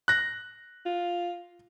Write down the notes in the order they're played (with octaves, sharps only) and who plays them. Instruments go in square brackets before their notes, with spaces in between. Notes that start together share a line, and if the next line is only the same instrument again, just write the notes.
[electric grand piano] F#6 A#6
[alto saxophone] F4